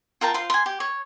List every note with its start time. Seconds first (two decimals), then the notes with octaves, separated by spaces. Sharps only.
0.21 F4 A#4 G5 A5
0.34 F4 C5 C6
0.50 G#5 C6
0.66 G4
0.80 C#5